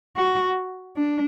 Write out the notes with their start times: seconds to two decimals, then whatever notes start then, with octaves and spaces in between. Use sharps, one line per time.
0.16 F#4
0.97 D4